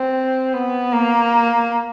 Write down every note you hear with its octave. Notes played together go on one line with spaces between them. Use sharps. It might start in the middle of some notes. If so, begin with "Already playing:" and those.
Already playing: C4
B3
A#3